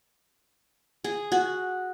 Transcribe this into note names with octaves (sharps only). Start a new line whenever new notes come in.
G#4
F#4